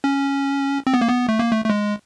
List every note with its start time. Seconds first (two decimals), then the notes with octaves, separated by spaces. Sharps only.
0.04 C#4
0.87 C4
0.94 B3
1.01 A#3
1.08 B3
1.29 A3
1.39 A#3
1.51 A3
1.65 A3
1.70 G#3